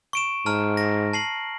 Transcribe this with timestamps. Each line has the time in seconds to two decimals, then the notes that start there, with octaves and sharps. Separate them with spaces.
0.13 C#6 D7 E7
0.46 G#2 A5 A#5 F6
0.77 A#6
1.13 A5 C7 F#7